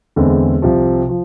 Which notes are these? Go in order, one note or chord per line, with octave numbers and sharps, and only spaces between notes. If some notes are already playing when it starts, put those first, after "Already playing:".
E2 D3 G#3 C4
C2 C3 F3
F3